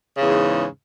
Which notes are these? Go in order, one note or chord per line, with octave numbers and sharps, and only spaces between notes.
E2 G#2 C#3